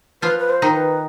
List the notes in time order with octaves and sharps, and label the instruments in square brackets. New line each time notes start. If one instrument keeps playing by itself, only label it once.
[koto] F3 F4 [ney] B4
[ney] B4
C5
[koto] D#3 D#4
[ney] B4